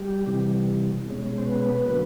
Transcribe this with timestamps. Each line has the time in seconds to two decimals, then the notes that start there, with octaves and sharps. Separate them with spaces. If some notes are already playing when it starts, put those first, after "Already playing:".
Already playing: G3 G4
0.27 C3 E3 G3
1.06 B2 G#3 C#4
1.38 C5
1.45 B3 B4
1.86 D3 F#3 A#3